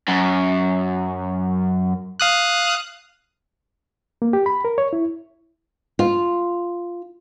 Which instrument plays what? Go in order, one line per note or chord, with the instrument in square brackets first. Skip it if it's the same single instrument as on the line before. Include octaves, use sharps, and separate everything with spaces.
[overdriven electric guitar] F#2
[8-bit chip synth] F5 D#6 F#6
[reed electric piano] A#3
G4
B5
A#4
C#5
E4
[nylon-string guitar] F4